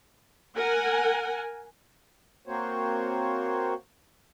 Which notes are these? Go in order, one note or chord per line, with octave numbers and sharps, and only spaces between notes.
A#4 F#5 G#5
A#3 C4 F#4 C5 C#5